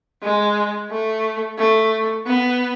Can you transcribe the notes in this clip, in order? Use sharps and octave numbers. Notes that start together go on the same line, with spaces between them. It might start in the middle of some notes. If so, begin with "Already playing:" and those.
G#3
A3
A3
B3